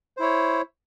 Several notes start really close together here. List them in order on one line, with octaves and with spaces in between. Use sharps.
C5 E4 C#5